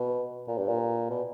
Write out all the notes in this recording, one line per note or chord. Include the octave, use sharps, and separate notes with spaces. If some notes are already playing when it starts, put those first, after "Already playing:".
Already playing: B2
A#2
G2
A#2
B2